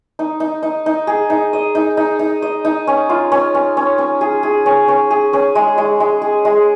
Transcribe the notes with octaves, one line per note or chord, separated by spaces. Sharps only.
D#4
D#4
D#4
D#4
G#4
D#4
D#5
D#4
D#4
D#4
D#5
D#4
C#4
F4
C#4
C#4
C#4
C#4
G#4
G#4
C#4
C#4
G#4
C#4
G#3
G#3
G#3
G#4
G#3